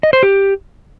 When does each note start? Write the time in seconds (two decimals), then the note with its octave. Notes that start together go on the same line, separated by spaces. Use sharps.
0.03 D#5
0.13 C5
0.23 G4